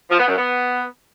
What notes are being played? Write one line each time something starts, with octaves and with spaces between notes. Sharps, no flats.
F3
B3
F#2
B3